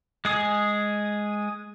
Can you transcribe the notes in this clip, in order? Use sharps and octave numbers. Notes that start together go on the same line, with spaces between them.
G#3 G#4 D#6